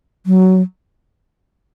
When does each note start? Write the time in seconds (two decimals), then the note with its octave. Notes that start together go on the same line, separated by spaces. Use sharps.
0.26 F#3